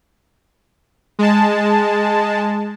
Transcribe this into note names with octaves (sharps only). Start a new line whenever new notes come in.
G#3 A5